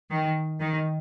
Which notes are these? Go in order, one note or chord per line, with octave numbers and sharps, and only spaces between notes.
D#3
D#3